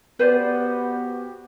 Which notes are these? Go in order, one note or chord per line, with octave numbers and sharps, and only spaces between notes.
B3 F#4 G4 B4 C5 D5